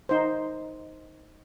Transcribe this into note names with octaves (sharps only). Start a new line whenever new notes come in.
D#4 C5